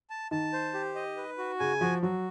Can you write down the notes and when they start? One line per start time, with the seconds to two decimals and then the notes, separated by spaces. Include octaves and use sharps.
0.10 A5
0.31 D#3 A5
0.53 C5
0.74 G4
0.95 D#5
1.17 B4
1.38 F#4
1.59 C#3 G#5
1.81 F3 F#4
2.02 F#3 F#4